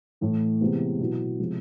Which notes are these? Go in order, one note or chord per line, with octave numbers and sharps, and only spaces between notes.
A2 E3 A3
C3 E3 G#3 B3 E4
B2 F#3 B3 E4
C3 F3 G#3